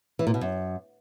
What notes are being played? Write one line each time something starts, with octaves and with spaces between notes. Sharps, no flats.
E3
A#2
B2
F#2